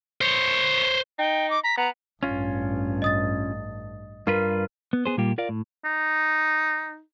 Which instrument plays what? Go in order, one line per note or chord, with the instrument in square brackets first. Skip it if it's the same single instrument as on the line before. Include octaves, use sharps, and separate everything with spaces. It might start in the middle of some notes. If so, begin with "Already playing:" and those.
[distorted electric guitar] C5 C#5
[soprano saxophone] D#4 [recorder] G5
[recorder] D6
[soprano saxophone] A#5 [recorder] B6
[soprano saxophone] B3 [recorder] A#5
[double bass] A1 G2 [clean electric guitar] C#4 F4
[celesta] D#5 D#6 A6
[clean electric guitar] G2 F4 B4 [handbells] A#4
[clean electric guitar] B3
B3 G#4 C5
A#2 G3 A#3 F4 G4
F4 A#4 D5 F5
A2
[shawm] D#4